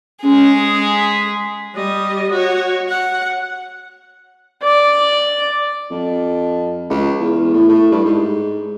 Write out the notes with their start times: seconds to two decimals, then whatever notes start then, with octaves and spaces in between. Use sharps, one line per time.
0.23 G#3 C#4 G#4
0.59 D#6
0.94 B6
1.75 G3 D#5
2.31 F#4 C#5
2.88 F#5
4.63 D5
5.91 F2
6.90 C#2
7.20 E2
7.54 A2
7.69 A2
7.91 G2
8.05 G#2